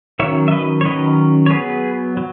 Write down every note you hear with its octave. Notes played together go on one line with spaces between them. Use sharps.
D#3 F#3 C#4 C#5 E5
E5
B4 D#5
C#5
D#3 F#3 C#4 B4 D#5
C#5
F#3 B3 G#4 B4
F#3